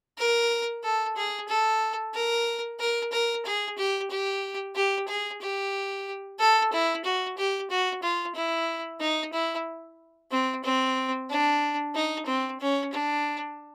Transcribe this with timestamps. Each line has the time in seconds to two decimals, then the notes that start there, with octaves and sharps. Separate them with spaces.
0.18 A#4
0.84 A4
1.16 G#4
1.49 A4
2.14 A#4
2.80 A#4
3.12 A#4
3.45 G#4
3.78 G4
4.11 G4
4.75 G4
5.08 G#4
5.41 G4
6.39 A4
6.72 E4
7.04 F#4
7.37 G4
7.70 F#4
8.03 F4
8.35 E4
9.00 D#4
9.33 E4
10.31 C4
10.64 C4
11.30 D4
11.95 D#4
12.27 C4
12.60 C#4
12.92 D4